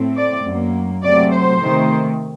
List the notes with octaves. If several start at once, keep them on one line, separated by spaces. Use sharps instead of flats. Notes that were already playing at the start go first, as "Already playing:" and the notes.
Already playing: A2 A3 C4
D5
F#2 F#3 A#3
C3 F#3 A3 D5
C5
C3 D#3 A3